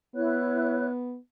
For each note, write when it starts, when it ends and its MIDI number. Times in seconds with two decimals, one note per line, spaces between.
0.15 1.18 59
0.15 0.88 64
0.15 0.88 73
0.15 0.88 90